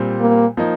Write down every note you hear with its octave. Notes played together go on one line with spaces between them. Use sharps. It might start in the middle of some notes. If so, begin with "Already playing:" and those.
Already playing: A#2 G3 C4
A#3
F3 A#3 D#4